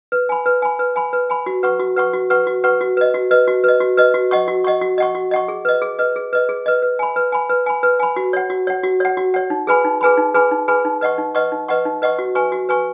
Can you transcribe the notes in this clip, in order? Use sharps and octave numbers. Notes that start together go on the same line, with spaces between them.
B4
G#5 B5
B4
G#5 B5
B4
G#5 B5
B4
G#5 B5
F#4
B4 F#5 C#6
F#4
B4 F#5 C#6
F#4
B4 F#5 C#6
F#4
B4 F#5 C#6
F#4
B4 D#5
F#4
B4 D#5
F#4
B4 D#5
F#4
B4 D#5
F#4
D#5 F#5 C#6
F#4
D#5 F#5 C#6
F#4
D#5 F#5 C#6
F#4
D#5 F#5 C#6
G#4
B4 D#5
G#4
B4 D#5
G#4
B4 D#5
G#4
B4 D#5
B4
G#5 B5
B4
G#5 B5
B4
G#5 B5
B4
G#5 B5
F#4
C#5 F#5
F#4
C#5 F#5
F#4
C#5 F#5
F#4
C#5 F#5
D#4
G#4 B4 G#5 B5
D#4
G#4 B4 G#5 B5
D#4
G#4 B4 G#5 B5
D#4
G#4 B4 G#5 B5
D#4
B4 D#5 F#5 C#6
D#4
B4 D#5 F#5 C#6
D#4
B4 D#5 F#5 C#6
D#4
B4 D#5 F#5 C#6
F#4
B4 G#5 C#6
F#4
B4 G#5 C#6